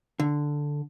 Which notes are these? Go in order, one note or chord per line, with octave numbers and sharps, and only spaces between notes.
D3